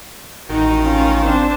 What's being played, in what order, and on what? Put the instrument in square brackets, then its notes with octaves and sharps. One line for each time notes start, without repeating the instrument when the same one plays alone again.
[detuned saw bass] A1 [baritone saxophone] D#3 [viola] D#4 F#4
[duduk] C#4 [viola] F4
[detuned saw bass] G#1 [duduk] C4 [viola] D4 C5